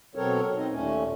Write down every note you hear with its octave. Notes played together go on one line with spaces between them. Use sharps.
B2 F#3 C4 A4 A#4 C#5
C4 D#4
D#2 A#2 A3 C#4